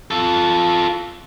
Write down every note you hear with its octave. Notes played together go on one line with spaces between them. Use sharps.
F4 A4